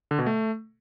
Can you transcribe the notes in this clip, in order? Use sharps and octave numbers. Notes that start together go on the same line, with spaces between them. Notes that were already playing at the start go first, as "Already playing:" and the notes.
D3
B2
A3